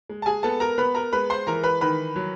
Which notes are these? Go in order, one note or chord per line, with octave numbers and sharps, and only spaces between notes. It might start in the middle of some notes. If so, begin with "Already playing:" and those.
G#3
A5
G#4 G#5
B3 A4 A5
A#4 A#5
B3 B4 B5
A#4 A#5
G#3 B4 B5
C5 C6
E3 A#4 A#5
B4 B5
D#3 B4 B5
F#3